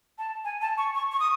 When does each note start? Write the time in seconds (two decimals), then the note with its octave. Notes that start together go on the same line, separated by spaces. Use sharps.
0.18 A5
0.45 G#5
0.61 A5
0.78 C#6
0.95 C#6
1.12 C#6
1.20 D#6